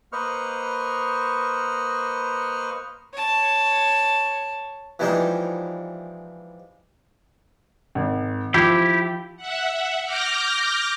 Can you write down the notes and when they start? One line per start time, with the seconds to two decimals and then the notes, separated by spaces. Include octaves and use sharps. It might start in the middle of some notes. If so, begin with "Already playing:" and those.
0.13 A#3 B4 C5 D#5 C#6 F6
3.13 C#5 A5
4.99 E3 F3 G3 G#3 D#4
7.95 G#1
8.54 F3 E4 G4
9.37 E5 F#5
10.03 D6 F6 G6 A#6